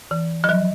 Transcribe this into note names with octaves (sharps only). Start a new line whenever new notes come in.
E3
F3
F#3